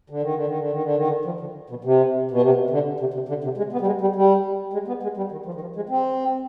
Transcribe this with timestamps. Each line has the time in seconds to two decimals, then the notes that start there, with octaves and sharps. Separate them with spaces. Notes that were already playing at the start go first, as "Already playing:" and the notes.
0.10 D3
0.22 D#3
0.34 D3
0.47 D#3
0.59 D3
0.70 D#3
0.83 D3
0.96 D#3
1.07 D3
1.25 F3
1.40 D3
1.70 B2
1.84 C3
2.31 B2
2.42 C3
2.70 D3
3.00 C3
3.14 C3
3.28 D3
3.44 C3
3.57 G#3
3.72 B3
3.81 G3
3.86 G#3
4.01 G3
4.16 G3
4.73 G#3
4.88 B3
5.03 G#3
5.17 G3
5.32 D#3
5.46 F3
5.54 D#3
5.61 F3
5.76 G#3
5.89 C4